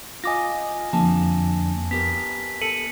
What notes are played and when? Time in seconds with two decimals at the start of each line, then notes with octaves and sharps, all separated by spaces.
0.24 F4 D#5 G#5 D6 A#6
0.93 F2 D3 F3 A#3 A5
1.91 B3 G4 A#4 B6
2.62 A4 C#7 D#7 F#7